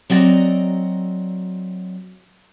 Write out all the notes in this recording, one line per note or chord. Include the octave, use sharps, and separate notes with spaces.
F#3 C4 F#4 D5 D#5 A#5